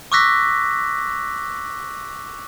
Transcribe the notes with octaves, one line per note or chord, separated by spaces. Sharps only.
C#6 D6 E6 F#6 A#6 B6